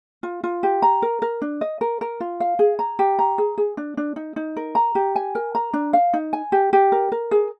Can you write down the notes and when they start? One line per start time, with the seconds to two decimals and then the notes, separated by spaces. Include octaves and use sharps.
0.23 F4
0.44 F4
0.63 G4
0.82 A#5
1.02 A#4
1.22 A#4
1.42 D4
1.61 D#5
1.81 A#4
2.01 A#4
2.20 F4
2.40 F5
2.59 G#4
2.79 A#5
2.99 G4
3.19 A#5
3.38 G#4
3.58 G#4
3.77 D4
3.97 D4
4.16 D#4
4.36 D#4
4.56 A#4
4.75 A#5
4.95 G4
5.16 G#5
5.35 A#4
5.55 A#5
5.73 D4
5.93 F5
6.14 D#4
6.33 G#5
6.52 G4
6.73 G4
6.92 A#4
7.12 A#4
7.31 G#4